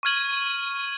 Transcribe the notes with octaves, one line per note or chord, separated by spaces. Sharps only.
C#6 F6 G#6 D#7 F#7